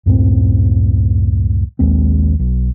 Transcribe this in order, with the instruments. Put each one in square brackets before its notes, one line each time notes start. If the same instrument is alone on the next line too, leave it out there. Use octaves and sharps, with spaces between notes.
[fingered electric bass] C#2 F#2 A2 C4
A#1 D#2 G#3 C4
B1